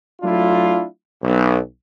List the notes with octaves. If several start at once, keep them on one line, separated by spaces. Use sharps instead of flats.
F#3 A3 D4 E4 F4
B1